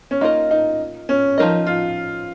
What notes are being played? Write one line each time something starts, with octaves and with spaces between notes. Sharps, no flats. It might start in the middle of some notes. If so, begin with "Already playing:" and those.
C#4
A#3 D#4 F4 A#4 D#5
D#4
C#4
F3 A#3 D#4 A#4 D#5
F4